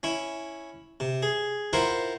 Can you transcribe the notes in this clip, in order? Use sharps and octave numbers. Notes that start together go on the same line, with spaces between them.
C#4 E4
C3
G#4
E4 F4 A#4 C5 F#5 G5